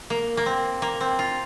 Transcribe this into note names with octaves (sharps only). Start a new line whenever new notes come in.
A#3
A#3
C4
A#3
C4
F4